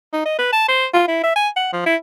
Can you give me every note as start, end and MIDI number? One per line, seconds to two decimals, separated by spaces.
0.13 0.25 63
0.25 0.34 75
0.38 0.52 71
0.53 0.67 81
0.68 0.86 72
0.94 1.05 65
1.08 1.20 64
1.23 1.33 76
1.36 1.49 80
1.56 1.70 78
1.73 1.81 53
1.86 1.96 64